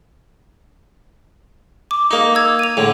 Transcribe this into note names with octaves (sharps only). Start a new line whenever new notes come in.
D6
A#3 D#4
E6 G#6
D#7 F7
A2 D3